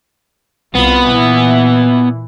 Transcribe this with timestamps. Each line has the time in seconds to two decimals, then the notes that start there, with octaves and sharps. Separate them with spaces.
0.75 C2 B3 F4 B5
1.07 A#2 E3